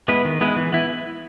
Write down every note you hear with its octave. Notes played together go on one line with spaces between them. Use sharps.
G#3 B3 E4 B4
D#3
G#3 B3 E4 B4
E3
B3 E4